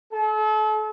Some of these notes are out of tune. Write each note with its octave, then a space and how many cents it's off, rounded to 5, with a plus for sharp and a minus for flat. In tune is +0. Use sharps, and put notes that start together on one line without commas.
A4 -40